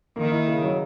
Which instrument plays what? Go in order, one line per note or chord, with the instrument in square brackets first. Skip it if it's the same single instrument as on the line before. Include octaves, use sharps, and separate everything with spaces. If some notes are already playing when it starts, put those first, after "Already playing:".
[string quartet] D#3 [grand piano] A#3
[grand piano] E4
C#3
F#3